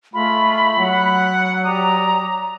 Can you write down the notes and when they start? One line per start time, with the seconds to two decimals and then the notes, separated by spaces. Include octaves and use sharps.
0.14 G#3 A3 F4 B5
0.79 F#3 F#5
1.64 G4 D5 A#5 D#6